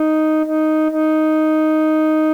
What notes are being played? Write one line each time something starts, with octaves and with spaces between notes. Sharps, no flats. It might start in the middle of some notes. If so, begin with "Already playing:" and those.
Already playing: D#4
D#4
D#4